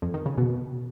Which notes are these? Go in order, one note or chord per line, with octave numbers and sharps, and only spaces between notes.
F2
D#3
C#3
B2